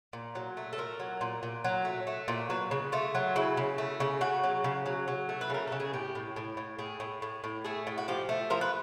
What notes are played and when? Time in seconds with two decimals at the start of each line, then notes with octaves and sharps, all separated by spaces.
0.13 A#2
0.35 F#3
0.57 A3
0.73 A4
0.78 A#2 A#4
1.00 F#3
1.21 A#2
1.43 A#2
1.65 F#3
1.85 A3
2.07 A3
2.28 A#2
2.50 F#3 B4
2.71 C#3
2.92 A3 F4
3.15 F#3
3.36 C#3 E4
3.57 C#3
3.78 A3
4.00 C#3
4.21 C#3 F#4
4.44 F#3
4.64 C#3
4.86 F#3
5.08 F#3
5.29 A3
5.41 B4
5.50 C#3 A#4
5.67 C#3 A4
5.80 G#4
5.93 A2 G4
6.15 A2
6.36 A2
6.57 A2
6.79 A2 G#4
7.00 A2
7.22 A2
7.44 A2
7.65 A3 G#4
7.87 A2
7.98 F#4
8.08 F3 G4
8.29 A3
8.50 F3 A#4
8.61 B4